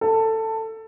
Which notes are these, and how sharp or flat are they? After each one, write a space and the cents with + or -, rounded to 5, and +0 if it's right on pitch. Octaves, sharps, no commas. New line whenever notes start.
A4 +15